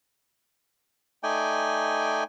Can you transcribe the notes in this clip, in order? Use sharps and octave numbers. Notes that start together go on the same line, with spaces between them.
A3 D#4 D5 G5 G#5